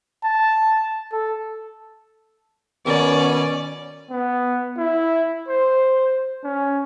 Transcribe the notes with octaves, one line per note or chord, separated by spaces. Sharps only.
A5
A4
B2 D#3 C#4 D5
B3
E4
C5
C#4